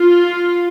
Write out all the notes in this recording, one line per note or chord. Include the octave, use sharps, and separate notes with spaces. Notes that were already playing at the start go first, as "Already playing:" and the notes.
Already playing: F4